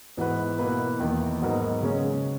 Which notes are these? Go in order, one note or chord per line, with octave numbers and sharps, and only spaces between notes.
G#2 E3 B3 F#4 B4
B2 A#3 E4 B4
E2 D#3 A#3
G#2 F#3 B3 D#4 A#4
C#3 G#3 C#4